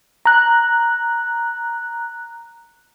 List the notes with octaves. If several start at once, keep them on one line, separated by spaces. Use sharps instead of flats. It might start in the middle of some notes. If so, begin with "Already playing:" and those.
A#5 F#6